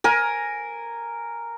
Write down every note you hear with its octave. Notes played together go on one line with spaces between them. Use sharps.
A#4 G#5